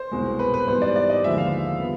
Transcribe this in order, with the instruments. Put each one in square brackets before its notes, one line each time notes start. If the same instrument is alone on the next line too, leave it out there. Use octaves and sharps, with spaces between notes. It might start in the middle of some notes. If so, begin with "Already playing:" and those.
Already playing: [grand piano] C5
C2 B2 G#3
B4
B4
G#2 E3 G3 B3 C5
D5
D5
D#5
D#2 D3 F3 G#3 B3 E5
F5
D3 G3 B3